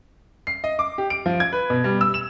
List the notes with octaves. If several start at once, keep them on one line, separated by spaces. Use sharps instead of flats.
C7
D#5
D6
G4
D7
F3
G#6
B4
B2
G3
E6
E7